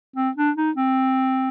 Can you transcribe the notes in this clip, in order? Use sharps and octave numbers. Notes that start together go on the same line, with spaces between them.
C4
D4
D#4
C4